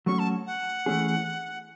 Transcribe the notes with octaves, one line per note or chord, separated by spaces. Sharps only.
F#3 A3 C#4 F#4 C#6
A5
F#5
E3 A3 C#4 G#4